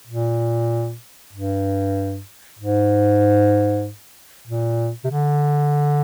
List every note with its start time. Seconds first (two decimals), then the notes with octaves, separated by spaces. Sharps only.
0.07 A#2
1.33 G2
2.59 G#2
4.47 A#2
5.04 C3
5.10 D3